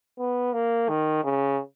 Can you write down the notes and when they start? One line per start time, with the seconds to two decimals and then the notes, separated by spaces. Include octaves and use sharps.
0.18 B3
0.53 A#3
0.89 D#3
1.24 C#3